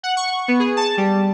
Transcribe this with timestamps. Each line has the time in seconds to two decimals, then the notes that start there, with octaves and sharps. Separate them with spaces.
0.03 F#5
0.17 C#6
0.48 B3
0.60 G#4
0.77 A5
0.97 G3